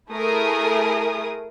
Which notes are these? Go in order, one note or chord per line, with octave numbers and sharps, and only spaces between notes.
A3 E4 G#4 A#4 D#6